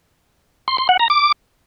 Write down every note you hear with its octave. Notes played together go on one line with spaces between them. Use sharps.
C6
C6
F#5
A#5
D6